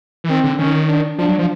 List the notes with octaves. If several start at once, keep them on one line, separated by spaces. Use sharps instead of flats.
E3
D#3 C4
D3
D#3 C#4
D4
F3 D4
F#3
F3